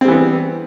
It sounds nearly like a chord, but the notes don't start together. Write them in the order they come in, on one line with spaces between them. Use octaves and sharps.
C4 G3 E3 B3